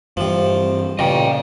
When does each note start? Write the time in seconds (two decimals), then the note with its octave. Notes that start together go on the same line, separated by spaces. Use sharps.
0.17 G2 C3 E3 F3 G3
0.99 A1 A#2 C#3 D#5 G5